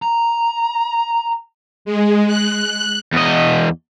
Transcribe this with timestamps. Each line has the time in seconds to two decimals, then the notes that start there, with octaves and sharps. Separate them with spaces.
0.02 A#5
1.85 G#3
2.27 F#6
3.13 E2 D#5